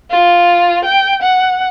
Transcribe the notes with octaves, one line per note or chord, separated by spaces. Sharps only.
F4
G5
F#5